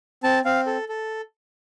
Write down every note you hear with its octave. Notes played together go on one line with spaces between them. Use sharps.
C4 A5
C4 F5
A4
A4